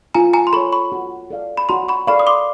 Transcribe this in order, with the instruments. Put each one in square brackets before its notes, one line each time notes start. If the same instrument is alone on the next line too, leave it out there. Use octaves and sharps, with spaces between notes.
[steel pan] F4 [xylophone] G#5 A#5
[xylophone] G#5 A#5
C6
[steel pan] A4 C#5 [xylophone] B5 C#6
[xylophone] B5 C#6
[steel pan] F#4
A4 D5 F5
[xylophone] B5
[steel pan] F#4 [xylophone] A#5 C6
[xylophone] B5 C#6
[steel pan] A4 D5 F5 [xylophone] B5 C#6
[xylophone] D#6
C6 D6